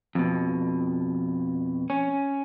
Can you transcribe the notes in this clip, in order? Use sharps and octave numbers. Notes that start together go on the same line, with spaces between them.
F2 B2
C#4